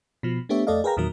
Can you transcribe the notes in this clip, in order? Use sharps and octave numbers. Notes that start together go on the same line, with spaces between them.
B2 F3
A3 B3 D4 G4 C#5 E5
F2 A3 A4 D5 D#5 F5
G#4 A#4 B4 F5 G5 A#5
E2 A#2 D#3 F#3 A#4